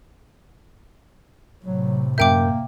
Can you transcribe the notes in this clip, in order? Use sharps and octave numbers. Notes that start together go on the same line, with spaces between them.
A2 C3 F#3
F#2 A#3 A#4 E5 G5 D6 G6